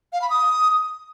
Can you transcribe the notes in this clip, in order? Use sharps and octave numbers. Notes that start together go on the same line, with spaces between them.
F5
B5
D#6